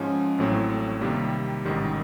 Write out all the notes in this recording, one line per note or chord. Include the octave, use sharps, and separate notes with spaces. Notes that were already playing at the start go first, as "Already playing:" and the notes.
Already playing: G#2 F3 G#3 C#4
A1 A2 F#3 A3 C4
C3 D#3 G3 A#3
A1 G#2 D#3 G3